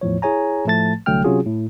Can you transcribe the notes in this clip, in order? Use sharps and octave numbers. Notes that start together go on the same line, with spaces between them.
E2 A2 F3 C#5
E4 G#4 C#5 G#5 A#5
A2 F3 A3 A5 A6
C2 D3 F#3 A3 G5 F6
C3 F#3 C#4 F4 F#4 G#4
A2